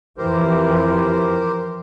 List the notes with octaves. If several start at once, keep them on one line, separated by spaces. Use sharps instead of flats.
F2 E3 G4 A#4 C5